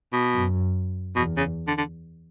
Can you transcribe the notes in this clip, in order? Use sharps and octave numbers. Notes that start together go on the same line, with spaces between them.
B2
F#2
E2 B2
C#3
D3
D3